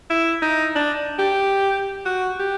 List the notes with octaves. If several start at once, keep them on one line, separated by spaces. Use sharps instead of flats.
E4
D#4
D4
G4
F#4
G4